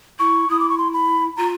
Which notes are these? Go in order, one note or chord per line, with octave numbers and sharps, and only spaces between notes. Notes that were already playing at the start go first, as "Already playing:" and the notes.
E4 C#6
E4 D#6
D6
C#6
C6
B5
F4 A#5